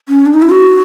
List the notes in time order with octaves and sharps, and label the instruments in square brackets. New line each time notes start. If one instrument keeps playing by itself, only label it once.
[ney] C#4
D4
D#4
E4
F#4